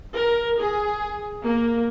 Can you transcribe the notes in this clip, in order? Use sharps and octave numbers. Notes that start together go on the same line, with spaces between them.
A#4
G#4
A#3